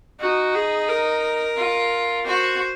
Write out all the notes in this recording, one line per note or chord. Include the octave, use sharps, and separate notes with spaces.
D#4 F#4
G#4
A#4
F4
F#4 C5